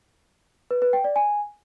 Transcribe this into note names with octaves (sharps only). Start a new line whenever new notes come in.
B4
B4
G5
D5
G#5